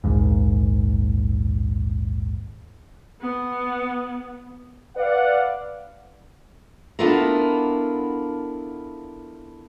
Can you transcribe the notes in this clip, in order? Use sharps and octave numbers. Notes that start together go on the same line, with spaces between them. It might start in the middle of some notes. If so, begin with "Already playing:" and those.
A#1 D#2 G#2
B3
B4 D5 F5 F#5
B3 D4 E4 F4 A4 A#4